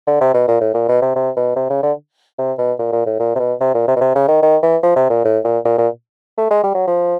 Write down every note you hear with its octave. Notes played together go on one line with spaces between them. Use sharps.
D3
C3
B2
A#2
A2
A#2
B2
C3
C3
B2
C3
C#3
D3
C3
B2
A#2
A#2
A2
A#2
C3
B2
C3
A#2
C3
B2
C3
C#3
D#3
D#3
E3
F3
C3
A#2
A2
A#2
A#2
A#2
A3
G#3
G3
F#3
F3